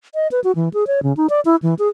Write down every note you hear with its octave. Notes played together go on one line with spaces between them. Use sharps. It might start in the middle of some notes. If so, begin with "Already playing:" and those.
D#5
B4
F#4
E3
G#4
C#5
C#3
D#4
D5
E4
E3
G#4